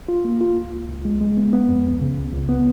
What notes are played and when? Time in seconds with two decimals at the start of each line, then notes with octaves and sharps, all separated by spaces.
0.08 F4
0.25 A#3
0.41 F4
0.57 C#2
0.73 C#2
0.89 C#2
1.05 G#3
1.21 G#3
1.37 B3
1.53 B3
1.69 F2
1.85 C#2
2.01 C#3
2.18 C#2
2.33 C#2
2.49 B3